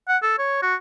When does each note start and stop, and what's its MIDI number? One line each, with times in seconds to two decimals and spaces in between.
0.09 0.17 78
0.22 0.38 69
0.39 0.62 73
0.62 0.75 66